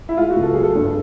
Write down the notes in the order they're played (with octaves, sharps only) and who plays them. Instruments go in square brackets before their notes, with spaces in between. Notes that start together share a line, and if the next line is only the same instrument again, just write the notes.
[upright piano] E4
G#3 F4
F#4
C#2
A4
F#3 G#4
A4
G2